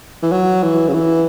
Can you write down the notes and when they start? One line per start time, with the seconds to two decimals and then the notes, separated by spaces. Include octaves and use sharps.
0.23 E3
0.32 F#3
0.63 E3
0.88 C#3
0.94 E3